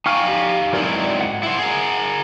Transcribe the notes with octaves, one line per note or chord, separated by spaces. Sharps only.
D#4 F5 G5 G#5 C#6 F6
G4
G#2 F#3 C4 E4 A#4 D5
F#5
E4 C5
G#4 A#4